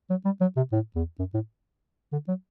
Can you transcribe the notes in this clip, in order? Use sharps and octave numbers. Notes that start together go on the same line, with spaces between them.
F#3
G3
F#3
C3
A2
E2
F#2
A2
D3
F#3